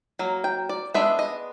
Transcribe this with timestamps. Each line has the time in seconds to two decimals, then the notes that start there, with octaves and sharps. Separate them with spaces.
0.19 F#3 A#3
0.44 G5
0.69 D5
0.94 G#3 B3 D4 E5
1.19 D#5